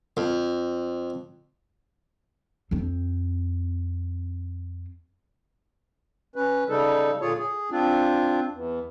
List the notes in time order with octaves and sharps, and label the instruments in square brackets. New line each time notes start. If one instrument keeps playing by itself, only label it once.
[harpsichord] F2
[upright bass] F2 C4
[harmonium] C#4 B4
C#3 G3 D#4 A4
A#2 D3 F4 G#4 C#5
G#4
C4 D4 F4
E2